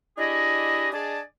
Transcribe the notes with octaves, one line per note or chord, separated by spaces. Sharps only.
D4 E4 G4 G#4 D#5
D4 G#4 D5 D#5 G#5 A5